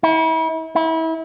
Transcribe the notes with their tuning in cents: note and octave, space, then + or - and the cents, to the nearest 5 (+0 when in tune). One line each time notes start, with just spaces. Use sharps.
E4 -40
E4 -30